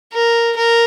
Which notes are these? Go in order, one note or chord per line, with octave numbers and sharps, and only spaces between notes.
A#4
A#4